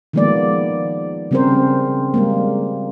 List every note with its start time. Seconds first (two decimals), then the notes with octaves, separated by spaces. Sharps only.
0.13 D#3 F3 G#3 A#3 B3 D5
1.31 C#3 G3 C4 C#4 A#4 C5
2.14 G3 G#3 A#3